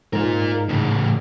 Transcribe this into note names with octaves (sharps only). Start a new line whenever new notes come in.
G#2 F4 A#4
A2 C#3